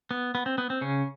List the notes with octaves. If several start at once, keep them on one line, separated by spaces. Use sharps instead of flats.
B3
B3
C4
B3
C4
C#3 C#4